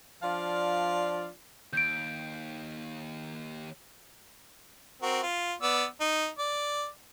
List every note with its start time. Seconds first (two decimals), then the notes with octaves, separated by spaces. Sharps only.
0.22 F3 D4 F4 D5 F5
1.73 D#2 G6 D7
5.02 C4 F#4 A#4
5.23 F4
5.62 B3 D5 E6
6.00 D#4
6.39 D5